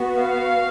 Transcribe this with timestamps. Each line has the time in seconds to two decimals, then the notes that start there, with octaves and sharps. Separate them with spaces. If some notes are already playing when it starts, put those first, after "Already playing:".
Already playing: B3 F#4
0.20 F5